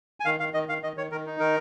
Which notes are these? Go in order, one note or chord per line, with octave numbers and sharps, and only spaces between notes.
G#5
D#3 F5
D#3 F5
D#3 D#5
D#3 F5
D#3 D#5
D#3 C#5
D#3 A#4
D#4
D#3 A#4